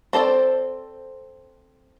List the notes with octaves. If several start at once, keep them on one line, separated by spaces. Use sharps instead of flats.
C4 A4 C5 D5